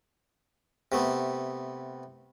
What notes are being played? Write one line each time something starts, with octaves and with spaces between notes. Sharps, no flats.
C3 A3 B3